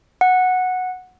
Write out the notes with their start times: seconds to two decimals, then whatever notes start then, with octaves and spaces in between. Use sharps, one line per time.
0.21 F#5